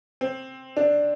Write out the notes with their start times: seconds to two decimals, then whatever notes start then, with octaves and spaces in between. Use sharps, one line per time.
0.21 C4
0.77 D4